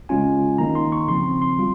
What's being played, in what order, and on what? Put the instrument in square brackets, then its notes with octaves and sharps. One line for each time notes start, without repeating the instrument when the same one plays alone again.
[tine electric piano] C#3 G#3 C#4 F4 G#5
D#3 A#3 D#4 A#5
C6
C#6
C#3 F3 C4 C6
C6
G3 F4